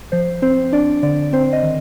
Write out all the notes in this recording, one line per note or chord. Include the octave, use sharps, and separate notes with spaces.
F3 C5
C4 C5
D4 D5
D3 D5
C4 C5
D#5
D#3